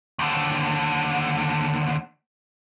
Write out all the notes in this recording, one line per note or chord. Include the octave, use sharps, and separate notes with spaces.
D#2 D3